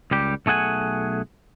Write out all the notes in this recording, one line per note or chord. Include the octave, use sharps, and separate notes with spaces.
C#2 G3 G4
B1 A3 G#4 F#5 G#5